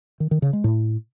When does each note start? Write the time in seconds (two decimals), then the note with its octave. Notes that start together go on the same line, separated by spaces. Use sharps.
0.20 D#3
0.31 D#3
0.42 C#3
0.53 G#3
0.64 A2